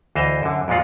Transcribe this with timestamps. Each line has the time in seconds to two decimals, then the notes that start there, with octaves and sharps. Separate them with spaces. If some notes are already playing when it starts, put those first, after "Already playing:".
0.15 D2 E3 C5 D#5 F5
0.43 F#2 D3
0.68 F2 A#2 G#3 F4 F#5